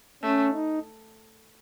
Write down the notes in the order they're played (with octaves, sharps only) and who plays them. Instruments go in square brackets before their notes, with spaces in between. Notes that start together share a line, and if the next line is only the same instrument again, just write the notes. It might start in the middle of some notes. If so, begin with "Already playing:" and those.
[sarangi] A3 [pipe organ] C#4
[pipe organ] D#4